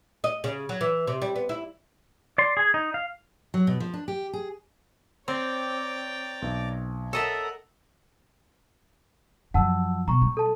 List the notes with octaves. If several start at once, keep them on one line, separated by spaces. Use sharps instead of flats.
D#5
C#3
F#3
E3
C3
G3
B3
E4
D5 C6
G#4 G#5
D#4
F5
F#3
B2
F3
D4
G4
G#4
C4 C#5 D5 G5 A#5 D6
B1
A4 A#4 C#5 D#5 E5 F#5
F#2 F3 F#5 A5 E6
B2 A#5 C#6
G3
A4 A5